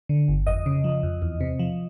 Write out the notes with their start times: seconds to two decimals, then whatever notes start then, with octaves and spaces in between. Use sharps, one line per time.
0.09 D3
0.28 G1
0.47 F2 D#5
0.66 C#3
0.84 F3
1.03 F2
1.22 E2
1.41 C3
1.59 F3